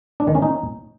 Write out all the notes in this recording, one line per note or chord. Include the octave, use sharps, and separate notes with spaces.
D4
D#3
C#4
D#4